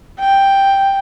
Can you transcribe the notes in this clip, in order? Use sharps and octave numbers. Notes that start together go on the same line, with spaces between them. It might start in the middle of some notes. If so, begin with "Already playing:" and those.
G5